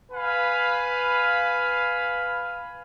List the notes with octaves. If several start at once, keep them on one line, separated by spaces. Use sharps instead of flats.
B4 F5 G#5 B5